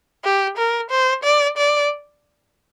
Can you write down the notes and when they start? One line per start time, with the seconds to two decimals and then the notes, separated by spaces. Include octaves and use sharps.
0.25 G4
0.58 A#4
0.91 C5
1.24 D5
1.58 D5